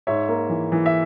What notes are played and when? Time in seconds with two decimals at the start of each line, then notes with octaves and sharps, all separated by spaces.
0.07 G#2 C#5 E5
0.29 A#3
0.49 E3
0.72 E3
0.86 E5